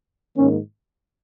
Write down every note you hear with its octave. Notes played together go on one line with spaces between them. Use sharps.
G#2 D#3 A#3 C#4